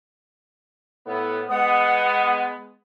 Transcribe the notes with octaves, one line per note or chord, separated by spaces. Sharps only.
A2 B3
G#3 B3 F#5 D#6